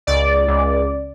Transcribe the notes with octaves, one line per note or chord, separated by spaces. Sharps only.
C#2 D5
C#2